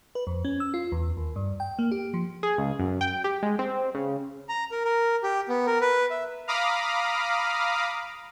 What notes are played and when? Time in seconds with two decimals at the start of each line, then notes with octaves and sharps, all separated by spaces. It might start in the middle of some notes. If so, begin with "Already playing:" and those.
0.15 B4
0.27 F2
0.45 C#4
0.60 E6
0.74 F4
0.92 E2
1.17 D#2
1.36 G2
1.60 G5
1.79 A#3
1.92 G4
2.14 F3
2.43 G#4
2.58 C#2
2.79 F#2
3.01 G5
3.24 G4
3.43 G#3
3.59 C4
3.95 C#3
4.49 A#5
4.71 A#4
4.85 A#4
5.23 G4
5.49 B3
5.66 A#4
5.81 B4
6.11 E5
6.47 F5 A#5 B5 D6 D#6 F6